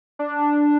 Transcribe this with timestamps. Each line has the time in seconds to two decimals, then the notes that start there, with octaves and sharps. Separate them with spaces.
0.19 D4